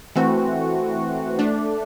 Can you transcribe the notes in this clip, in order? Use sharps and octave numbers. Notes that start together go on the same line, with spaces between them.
E3 A3 C4 F#4
A3 D4